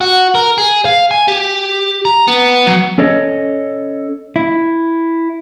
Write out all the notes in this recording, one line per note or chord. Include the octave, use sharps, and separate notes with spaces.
F#4
A#4
G#4
F5
G#5
G4
A#5
B3
F#3
C#4 A4 C#5 D#5
E4